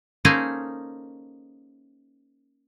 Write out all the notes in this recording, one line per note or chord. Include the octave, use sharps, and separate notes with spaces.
A#3 C#4 D#4 G#4 A4 C5